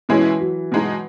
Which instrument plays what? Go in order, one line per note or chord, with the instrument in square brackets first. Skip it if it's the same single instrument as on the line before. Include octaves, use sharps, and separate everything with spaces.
[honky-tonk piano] B2 G#3 C#4 E4 [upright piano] E3
[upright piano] F#3
[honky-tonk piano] B2 G#3 D#4